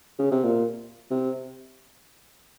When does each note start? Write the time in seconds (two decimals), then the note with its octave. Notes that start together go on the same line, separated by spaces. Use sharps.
0.19 C#3
0.31 C3
0.44 A#2
1.11 C3